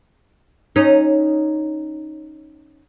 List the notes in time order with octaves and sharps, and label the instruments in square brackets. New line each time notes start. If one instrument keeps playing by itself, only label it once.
[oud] C#4 D#4